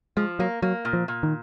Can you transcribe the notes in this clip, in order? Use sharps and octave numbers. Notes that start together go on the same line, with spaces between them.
F3 G#3
F#3 A#3
F#3 A#3
A#2
F3
A#2
D#3